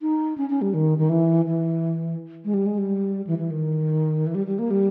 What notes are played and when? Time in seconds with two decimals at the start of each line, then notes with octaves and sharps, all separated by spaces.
0.02 D#4
0.38 C#4
0.50 C#4
0.62 G3
0.74 D#3
0.98 D#3
1.09 E3
1.45 E3
2.45 G#3
2.54 G3
2.66 G#3
2.78 G3
3.27 E3
3.38 E3
3.51 D#3
4.27 E3
4.35 G3
4.47 G3
4.59 A#3
4.71 G3